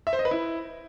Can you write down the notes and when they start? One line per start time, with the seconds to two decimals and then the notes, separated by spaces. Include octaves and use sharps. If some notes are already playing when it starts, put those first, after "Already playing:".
0.07 E5
0.13 C5
0.19 D#5
0.25 B4
0.31 E4